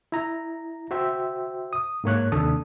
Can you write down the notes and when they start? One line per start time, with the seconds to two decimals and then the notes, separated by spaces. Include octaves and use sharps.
0.12 E4 A#5
0.91 F#4 C5 E5 G5
1.73 D#6
2.04 G#2 A#3 C#5 F#6
2.32 D#2 C3 D4 A4 D#6